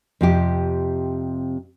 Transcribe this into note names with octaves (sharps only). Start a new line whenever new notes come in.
F2 C3 G4